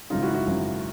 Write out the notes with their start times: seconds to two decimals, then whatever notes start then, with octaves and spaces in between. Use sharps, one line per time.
0.10 G#1 F#2 C#3 D#4 F4
0.23 E4 F#4
0.34 E4 F#4
0.47 G#1 F#2 C#3